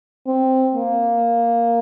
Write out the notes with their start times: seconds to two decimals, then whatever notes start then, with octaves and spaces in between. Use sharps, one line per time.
0.27 C4
0.75 A#3